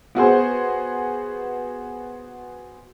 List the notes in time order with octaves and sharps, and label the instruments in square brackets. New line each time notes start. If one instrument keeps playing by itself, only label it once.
[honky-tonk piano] B3 F#4 G#4 C5